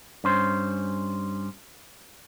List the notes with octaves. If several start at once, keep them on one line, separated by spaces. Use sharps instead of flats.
G2 C#4 C5